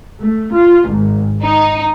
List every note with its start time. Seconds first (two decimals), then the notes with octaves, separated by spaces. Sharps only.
0.20 A3
0.53 F4
0.90 G#1
1.43 D#4